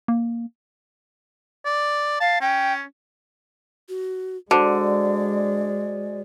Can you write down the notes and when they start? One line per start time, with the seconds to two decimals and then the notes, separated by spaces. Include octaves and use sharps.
0.08 A#3
1.66 D5
2.20 F5 A5
2.41 C#4 G5
3.89 F#4
4.51 D3 G#3 F#4 C5 D5